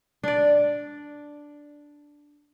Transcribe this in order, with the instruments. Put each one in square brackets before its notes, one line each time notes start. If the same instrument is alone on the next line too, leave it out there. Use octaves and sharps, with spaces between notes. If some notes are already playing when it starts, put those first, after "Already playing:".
[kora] D4 D5